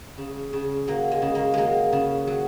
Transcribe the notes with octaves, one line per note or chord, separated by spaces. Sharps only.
C#3
C#3
F#3 A#3
G#3
C#3
A#3
F#3 G#3 A#3
C#3
F#3